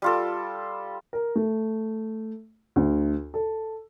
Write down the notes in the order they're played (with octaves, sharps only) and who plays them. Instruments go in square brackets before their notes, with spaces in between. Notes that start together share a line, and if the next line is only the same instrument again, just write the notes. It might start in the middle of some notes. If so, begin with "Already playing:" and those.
[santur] G3 F4 A4
[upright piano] A#4
A3
D2
A4